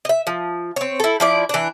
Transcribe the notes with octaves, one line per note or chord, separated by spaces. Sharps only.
D#5 E5
F3
C4 C#5
E4 A4
F3 E4 D5
E3 D4